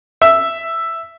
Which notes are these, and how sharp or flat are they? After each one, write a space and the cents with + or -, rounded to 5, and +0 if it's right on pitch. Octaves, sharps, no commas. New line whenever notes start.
E5 +5